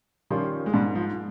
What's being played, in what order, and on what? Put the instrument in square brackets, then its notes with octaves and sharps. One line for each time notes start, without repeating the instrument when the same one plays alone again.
[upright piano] D#3 G3 C#4 F4 [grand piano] F3
[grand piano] G#3
[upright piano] G#2 [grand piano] G3
[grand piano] F3